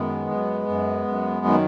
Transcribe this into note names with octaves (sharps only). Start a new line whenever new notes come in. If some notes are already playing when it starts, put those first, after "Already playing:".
Already playing: F#2 D#3 G#3 B3
F#2
F#2
F#2
D#3